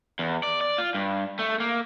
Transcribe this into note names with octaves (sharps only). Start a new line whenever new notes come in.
E2
D5
D5
F4
G2
A3
A#3